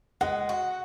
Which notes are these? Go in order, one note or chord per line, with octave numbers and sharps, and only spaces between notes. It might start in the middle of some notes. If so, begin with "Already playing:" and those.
G#3 F#5
F#4